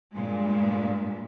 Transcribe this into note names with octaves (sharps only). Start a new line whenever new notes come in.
G2 A#2 G#3